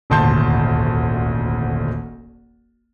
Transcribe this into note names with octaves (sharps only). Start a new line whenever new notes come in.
D#1 G#1 D2 A5 C6 G6